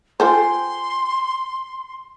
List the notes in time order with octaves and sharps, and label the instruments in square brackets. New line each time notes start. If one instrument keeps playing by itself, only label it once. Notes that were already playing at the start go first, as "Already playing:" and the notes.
[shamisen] F4 A4 C5 [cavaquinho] G5 G#5 [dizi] C6